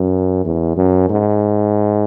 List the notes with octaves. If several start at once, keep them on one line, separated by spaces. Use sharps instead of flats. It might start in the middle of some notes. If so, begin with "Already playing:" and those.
Already playing: F#2
E2
F#2
G#2